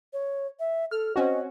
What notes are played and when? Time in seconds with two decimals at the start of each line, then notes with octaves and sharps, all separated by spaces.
0.13 C#5
0.60 E5
0.91 A4 F6
1.16 C4 C#4 F#4 D#5